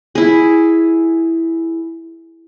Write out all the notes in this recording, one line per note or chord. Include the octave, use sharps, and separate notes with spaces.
E4 G#4